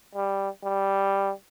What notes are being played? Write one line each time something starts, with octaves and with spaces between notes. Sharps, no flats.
G3
G3